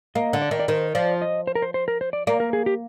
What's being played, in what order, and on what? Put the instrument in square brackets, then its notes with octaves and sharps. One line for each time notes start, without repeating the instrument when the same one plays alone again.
[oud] A#3 [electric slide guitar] D#5
[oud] D3
[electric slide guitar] D5
[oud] D#3
[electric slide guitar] D5
[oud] D#3 [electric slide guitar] C5
[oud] F3 [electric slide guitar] D5
[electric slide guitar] D#5
C5
A#4
C5
C5
A#4
C5
D5
[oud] A#3 [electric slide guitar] D5
[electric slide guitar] A#4
G#4
G4